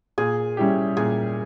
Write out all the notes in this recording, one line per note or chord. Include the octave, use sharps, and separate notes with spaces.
A#2 G#4
G3 C#4 E4 G4
A#2 G#4